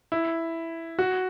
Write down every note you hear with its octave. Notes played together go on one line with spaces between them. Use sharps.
E4
F#4